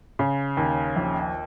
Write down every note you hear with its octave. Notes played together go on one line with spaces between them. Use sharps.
C#3
D#2
A#1